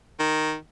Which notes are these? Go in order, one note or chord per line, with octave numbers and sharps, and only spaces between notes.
D#3